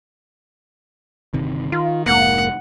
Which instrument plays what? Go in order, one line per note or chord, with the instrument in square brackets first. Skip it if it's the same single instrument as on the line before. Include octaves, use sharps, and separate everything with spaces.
[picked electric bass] G1 C3 D#3
[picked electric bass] D#3 [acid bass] F4
[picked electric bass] F1 G#2 [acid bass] A#3 [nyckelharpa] F#5